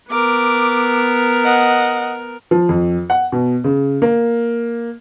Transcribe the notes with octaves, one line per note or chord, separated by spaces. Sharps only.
B3 A#4 D6
D#5 F#5
F3
F2
F#5
B2
C#3
A#3